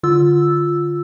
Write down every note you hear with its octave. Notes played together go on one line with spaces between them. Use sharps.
D3 F4 E6